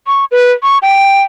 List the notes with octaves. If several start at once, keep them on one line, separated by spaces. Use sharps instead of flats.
C#6
B4
C#6
G5